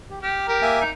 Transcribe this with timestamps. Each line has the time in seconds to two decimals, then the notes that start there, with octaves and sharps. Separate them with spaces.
0.10 G4
0.23 G4 F6
0.48 G4 A#4
0.62 A#3 E5 G#5
0.81 D#4